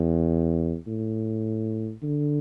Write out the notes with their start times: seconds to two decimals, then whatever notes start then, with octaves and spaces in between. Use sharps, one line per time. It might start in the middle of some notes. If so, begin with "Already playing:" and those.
Already playing: E2
0.87 A2
2.03 D3